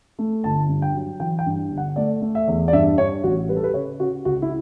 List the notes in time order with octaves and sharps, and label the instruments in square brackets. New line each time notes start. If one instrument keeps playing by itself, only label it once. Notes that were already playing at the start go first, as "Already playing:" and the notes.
[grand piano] A3
G1 A5
G2
G5
F#3
E3 G5
G5
G2
G1
F#5
A3 D5
A3
E5
E2
D5
G2 E5
G2 C#5
A1 F#4
G3 B4
A4
B4
C#3 C#5
C#3 F#4
C#2 F#4
E4